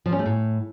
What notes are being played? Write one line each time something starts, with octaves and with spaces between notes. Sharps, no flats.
F3
C#4
A3
A2